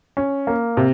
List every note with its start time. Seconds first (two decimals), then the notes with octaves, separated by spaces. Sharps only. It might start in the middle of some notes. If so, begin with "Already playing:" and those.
0.17 C#4
0.47 A#3
0.77 C3